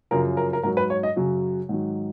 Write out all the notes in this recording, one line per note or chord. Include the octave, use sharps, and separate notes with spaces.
F#2 C#3 F3 A#4
A#4
A#4
G#2 F#3 A#4
B4
C#5
D#5
F#2 C#3 F#3
G#2 D#3 F#3